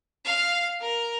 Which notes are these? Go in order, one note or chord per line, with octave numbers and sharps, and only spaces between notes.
F5
A#4